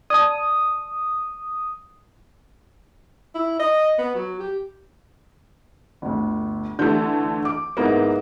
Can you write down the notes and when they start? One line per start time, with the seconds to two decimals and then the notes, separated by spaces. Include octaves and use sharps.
0.10 D5 A5 D#6
3.35 E4
3.60 D#5
3.99 B3
4.15 F#3
4.40 G4
6.02 G1 D2
6.79 D3 E3 A3 G6
7.45 D6
7.77 G#2 A#3 B3 E4